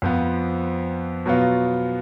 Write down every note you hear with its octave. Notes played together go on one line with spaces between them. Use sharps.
F2 F3 B3
B2 F#3 B3 F4